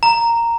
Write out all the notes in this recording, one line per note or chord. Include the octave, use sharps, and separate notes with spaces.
A#5